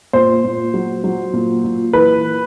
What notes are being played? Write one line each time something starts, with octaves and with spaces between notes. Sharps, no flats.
A#2 C5
A#2
F#3
F#3
A#2
A#2
E3 B4